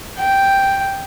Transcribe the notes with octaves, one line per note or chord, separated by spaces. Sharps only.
G5